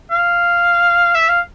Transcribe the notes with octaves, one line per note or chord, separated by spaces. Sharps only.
F5
E5
F5